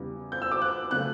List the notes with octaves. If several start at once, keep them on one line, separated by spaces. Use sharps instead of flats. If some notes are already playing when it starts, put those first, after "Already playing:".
Already playing: E2 C#3 G3
G6
E6
D6
F#6
C#3 F#3 A3 F#6